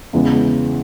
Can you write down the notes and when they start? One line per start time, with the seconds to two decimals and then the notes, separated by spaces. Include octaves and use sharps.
0.13 E2 C#3 E3 G#3